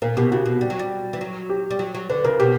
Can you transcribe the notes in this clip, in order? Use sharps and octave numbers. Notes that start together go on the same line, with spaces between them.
A#2 A#4
B2 G4
C#3 F#4
B2
G3
F#3
G3
E3
F#3
G4
G3
F#3
F#3
D3 B4
C#3 A#4
B2 G4